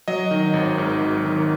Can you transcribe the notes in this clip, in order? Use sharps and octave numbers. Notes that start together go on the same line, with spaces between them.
F#3 D#5
D#3
G#1
G#2
F#3
D#3